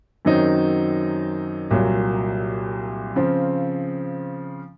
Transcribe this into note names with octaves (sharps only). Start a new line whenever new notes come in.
F#2 D#3 F#3 C4 D#4
C2 A#2 F#3
C#3 F3 C4 F4